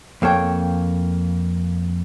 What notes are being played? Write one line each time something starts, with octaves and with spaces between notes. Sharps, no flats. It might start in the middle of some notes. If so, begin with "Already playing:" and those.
F2 A#3 A4 C#5 G5